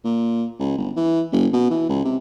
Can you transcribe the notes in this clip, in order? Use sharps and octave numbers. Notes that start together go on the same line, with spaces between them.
A#2
C#2
G1
E3
F#1
B2
E3
C#2
C3